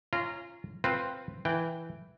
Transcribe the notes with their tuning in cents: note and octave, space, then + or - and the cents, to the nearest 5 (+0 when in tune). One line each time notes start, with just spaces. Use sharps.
C#4 +0 F4 -25 A#5 -10
C4 +0 F4 +0 B4 +0
E3 +0 G5 +0